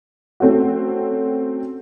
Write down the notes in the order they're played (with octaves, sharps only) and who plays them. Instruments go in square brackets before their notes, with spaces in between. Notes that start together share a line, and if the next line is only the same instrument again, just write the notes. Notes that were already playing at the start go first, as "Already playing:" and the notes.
[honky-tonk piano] A3 C4 C#4 F#4